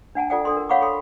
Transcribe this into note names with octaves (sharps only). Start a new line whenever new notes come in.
D4 F#5 G#5 A5
F4 A4 D5 F#5 G5
D4 A4 C6
A#4
C#5 F5 F#5 B5 C#6 D6
A4 G5 B5 C6